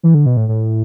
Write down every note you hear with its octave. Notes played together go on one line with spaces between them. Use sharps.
E3
D3
B2
A2
A2